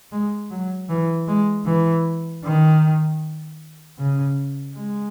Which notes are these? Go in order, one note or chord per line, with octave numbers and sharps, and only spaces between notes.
G#3
F#3
E3
G#3
E3
D#3
C#3
G#3